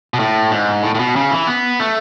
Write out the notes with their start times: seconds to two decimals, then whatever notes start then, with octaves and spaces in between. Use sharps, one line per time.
0.14 B2
0.20 A2
0.51 G#2
0.83 A2
0.95 A2
0.99 B2
1.16 C#3
1.31 E3
1.47 B3
1.80 A3